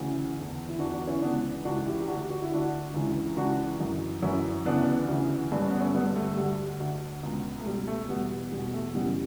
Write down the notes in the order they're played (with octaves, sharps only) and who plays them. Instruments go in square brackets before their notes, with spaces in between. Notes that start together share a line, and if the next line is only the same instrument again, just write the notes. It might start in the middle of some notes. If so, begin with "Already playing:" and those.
Already playing: [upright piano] D2 C#3 E3
E2 D3
E4
E2 D3 D4 F#4
D4 F#4
C#4 E4
C#2 C#3 E3 B3 D4
C#2 C#3 E3 D4 F#4
E4 G4
G4
D2 D4 F#4
D3
F#4
E4
D2 D3 D4 F#4
C#2 C#3 E3
C#2 C#3 E3 D4 F#4
F#2 E3
F#2 E3 C#4 E4
D2 C#3 E3 B3 D4
D2 C#3 E3
G2 D3 D4
C#4
B3
A3 C#4
G2 D3 G3 B3
A3
A3
D2 D3 G3
D2 D3
C#2 B2
A3
C#2 B2 G3
A3
E2 B2 G3 B3
E2 G3
B2
A3
F#2 C#3 E3 G3 B3